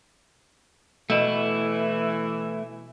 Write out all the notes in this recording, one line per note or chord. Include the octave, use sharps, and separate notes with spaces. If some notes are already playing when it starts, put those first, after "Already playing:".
B2 E3 A3 E4